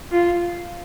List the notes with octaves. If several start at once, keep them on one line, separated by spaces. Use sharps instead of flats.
F4